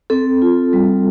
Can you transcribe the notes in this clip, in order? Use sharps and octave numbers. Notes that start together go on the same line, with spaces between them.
C4 A4
F4
G3